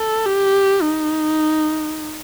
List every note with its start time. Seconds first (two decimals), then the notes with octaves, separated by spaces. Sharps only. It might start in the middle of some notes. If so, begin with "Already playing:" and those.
Already playing: A4
0.26 G4
0.82 D#4